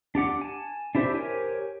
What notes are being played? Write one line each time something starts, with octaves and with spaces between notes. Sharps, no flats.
D4 G4 F#5 D6
G#5 A5
D4 E4 G4 C5 E5
G4 A#4 C5 C#5 G#5